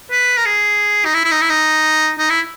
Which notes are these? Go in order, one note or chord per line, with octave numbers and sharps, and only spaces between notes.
B4
A#4
G#4
D#4
E4
E4
D#4
E4
D#4
D#4
E4